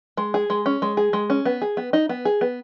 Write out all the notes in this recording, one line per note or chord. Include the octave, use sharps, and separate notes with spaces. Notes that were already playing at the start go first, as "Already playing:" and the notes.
G#3
G#4
G#3
C#4
G#3
G#4
G#3
C#4
B3
G#4
B3
D#4
B3
G#4
B3